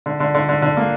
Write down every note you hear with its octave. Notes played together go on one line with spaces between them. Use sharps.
D3
D3
D3
D3
D3
A#3